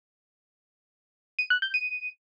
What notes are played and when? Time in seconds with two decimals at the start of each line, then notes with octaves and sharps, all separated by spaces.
1.39 D#7
1.50 F#6
1.62 G6
1.74 D#7